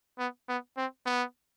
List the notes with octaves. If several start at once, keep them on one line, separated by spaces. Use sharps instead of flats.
B3
B3
C4
B3